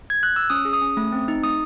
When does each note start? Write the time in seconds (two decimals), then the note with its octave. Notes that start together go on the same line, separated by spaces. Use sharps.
0.10 G#6
0.23 F#6
0.36 E6
0.50 C#4 D#6
0.65 G#4
0.73 D#6
0.81 C#4
0.97 A3
1.12 C4
1.28 D#4
1.43 A3 D#6